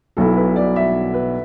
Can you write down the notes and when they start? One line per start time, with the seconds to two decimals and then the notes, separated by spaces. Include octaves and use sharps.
0.17 B1 B2 F#3 B3 E4 A4
0.37 B4
0.56 D5
0.76 E5
1.14 B4